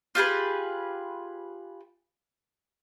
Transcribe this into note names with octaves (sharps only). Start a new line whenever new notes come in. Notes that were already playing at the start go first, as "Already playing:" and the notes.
F4 G4 G#4 B4